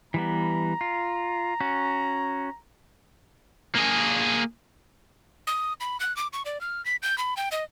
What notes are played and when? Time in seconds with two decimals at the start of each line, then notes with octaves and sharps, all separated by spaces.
0.14 E3 G3 B3 A#5
0.81 F4
1.61 C#4 F#4
3.75 A#3 G#4
5.47 D#6
5.80 B5
6.00 F#6
6.17 D6
6.33 C#6
6.46 D5
6.61 F6
6.86 B6
7.03 G6
7.18 B5
7.37 G5
7.52 D#5